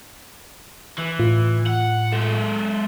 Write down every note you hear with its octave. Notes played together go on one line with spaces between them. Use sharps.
E3
A2 F4
F#5
G#3 A4